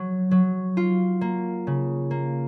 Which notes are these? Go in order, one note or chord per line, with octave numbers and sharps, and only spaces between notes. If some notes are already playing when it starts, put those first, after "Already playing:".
Already playing: F#3
F#3
F4
A#3
C#3
A#3